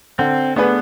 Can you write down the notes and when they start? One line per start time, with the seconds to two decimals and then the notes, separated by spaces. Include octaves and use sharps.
0.19 D3 C4
0.56 A3 B3 D4 G#4 B4